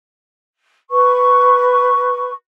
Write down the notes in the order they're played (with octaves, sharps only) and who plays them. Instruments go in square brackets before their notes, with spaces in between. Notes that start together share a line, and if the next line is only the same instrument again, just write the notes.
[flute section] B4 C#6